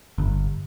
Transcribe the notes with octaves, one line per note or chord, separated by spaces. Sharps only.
G1